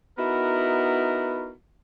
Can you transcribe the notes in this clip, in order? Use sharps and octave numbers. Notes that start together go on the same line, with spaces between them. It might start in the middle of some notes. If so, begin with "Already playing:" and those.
B3 D#4 E4 F#4 A#4